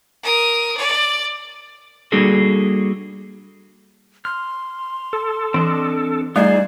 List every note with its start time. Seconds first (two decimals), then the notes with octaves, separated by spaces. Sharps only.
0.23 A#4 D#6
0.77 D5
2.12 G3 A#3 D4 F#4 G#4 A4
4.25 C6 F6
5.13 A4
5.54 E3 C4 D4 D#5
6.36 G3 A3 D#4 F4 G#4 C5 D5